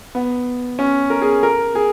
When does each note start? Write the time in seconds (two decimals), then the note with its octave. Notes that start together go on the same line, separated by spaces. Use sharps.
0.15 B3
0.79 C#4
1.10 A#4
1.22 G#4
1.43 A#4
1.75 G#4